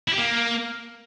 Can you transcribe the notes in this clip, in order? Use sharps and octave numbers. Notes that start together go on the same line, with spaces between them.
E4
G4
A#3